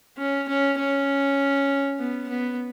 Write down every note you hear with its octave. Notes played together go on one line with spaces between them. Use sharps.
C#4
C#4
C#4
B3
B3